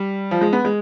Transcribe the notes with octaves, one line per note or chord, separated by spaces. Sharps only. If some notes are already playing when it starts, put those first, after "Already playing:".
Already playing: G3
F3
G#3
B3
G#3